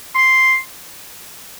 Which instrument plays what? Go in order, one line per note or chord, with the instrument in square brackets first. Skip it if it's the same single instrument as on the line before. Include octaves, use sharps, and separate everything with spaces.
[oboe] C6